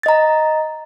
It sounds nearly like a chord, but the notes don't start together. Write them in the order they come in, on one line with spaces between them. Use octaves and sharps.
A6 D#5 A#5